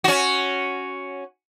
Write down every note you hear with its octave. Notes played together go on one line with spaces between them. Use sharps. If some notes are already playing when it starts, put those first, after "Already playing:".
C#4 F#4